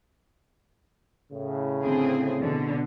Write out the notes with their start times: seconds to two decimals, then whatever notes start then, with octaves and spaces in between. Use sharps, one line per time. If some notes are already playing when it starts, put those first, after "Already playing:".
1.32 A2 C#3
1.83 D3 C4 G#4
2.40 B2 D3